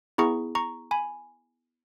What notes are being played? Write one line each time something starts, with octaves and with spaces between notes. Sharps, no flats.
B3 E4 G#4 A#5 C#6
A#5 C#6
G#5 B5